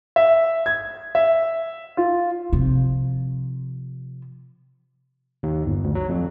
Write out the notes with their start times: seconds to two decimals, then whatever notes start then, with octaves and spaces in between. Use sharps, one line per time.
0.16 E5
0.66 G#6
1.15 E5
1.97 F4
2.53 C3 F3
5.43 D#2
5.65 G1
5.84 D2
5.95 F#3
6.09 F2